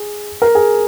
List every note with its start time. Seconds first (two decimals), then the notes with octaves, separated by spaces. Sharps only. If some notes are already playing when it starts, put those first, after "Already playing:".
Already playing: G#4
0.42 A#4
0.55 G#4